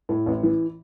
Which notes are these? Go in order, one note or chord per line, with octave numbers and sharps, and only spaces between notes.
A2
A1
E3